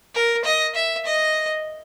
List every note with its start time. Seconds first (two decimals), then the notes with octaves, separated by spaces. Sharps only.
0.15 A#4
0.45 D#5
0.75 E5
1.06 D#5